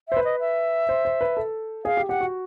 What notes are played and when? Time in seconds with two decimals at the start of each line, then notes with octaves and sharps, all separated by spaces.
0.09 C5 E5
0.17 B4
0.25 D#5
0.40 E5
0.89 C5
1.05 C5
1.21 B4
1.37 A4
1.85 G#4 F5
1.97 G4
2.09 G4 F#5
2.21 F#4